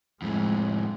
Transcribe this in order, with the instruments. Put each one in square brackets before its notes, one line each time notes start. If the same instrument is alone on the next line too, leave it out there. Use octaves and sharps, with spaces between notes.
[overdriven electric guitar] F2 A2 [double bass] G#3